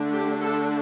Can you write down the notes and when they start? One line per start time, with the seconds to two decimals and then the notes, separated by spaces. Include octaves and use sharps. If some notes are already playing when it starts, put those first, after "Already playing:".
Already playing: D3 A3 D4
0.12 G4
0.42 A4